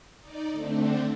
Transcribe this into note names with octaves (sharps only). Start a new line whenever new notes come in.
D#4 D5
D3 A3 C4 D4